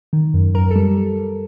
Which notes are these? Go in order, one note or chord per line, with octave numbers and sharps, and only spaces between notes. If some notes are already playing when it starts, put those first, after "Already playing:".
D#3
F#2
F#2 A#4
A4
G3